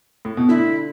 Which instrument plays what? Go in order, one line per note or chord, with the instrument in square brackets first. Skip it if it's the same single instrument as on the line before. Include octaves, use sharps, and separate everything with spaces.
[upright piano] A2
B2
[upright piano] D3 [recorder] E4